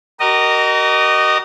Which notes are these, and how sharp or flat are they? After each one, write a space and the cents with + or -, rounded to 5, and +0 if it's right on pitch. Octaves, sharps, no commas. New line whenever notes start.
F#4 +45 A#4 -5 D#5 -20